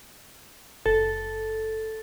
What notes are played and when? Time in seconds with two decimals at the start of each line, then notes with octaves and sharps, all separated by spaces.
0.86 F#1 A4